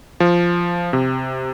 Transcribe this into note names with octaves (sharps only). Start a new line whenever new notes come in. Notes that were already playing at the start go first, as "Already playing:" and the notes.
F3
C3